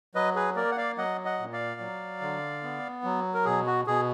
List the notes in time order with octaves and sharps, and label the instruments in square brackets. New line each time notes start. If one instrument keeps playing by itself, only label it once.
[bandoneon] F#3 B4 D#5
G#4 B4
A#3 A#4 D5
F#5
D5 F5
F#3 D#5 F#5
D#5 F#5
A#2
D5 F5
F#3
D3
B3
F#3
A#4
B2 G#4
F#4
B2 G#4